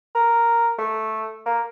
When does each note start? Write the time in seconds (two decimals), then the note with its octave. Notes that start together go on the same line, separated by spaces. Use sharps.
0.15 A#4
0.79 A3
1.46 A#3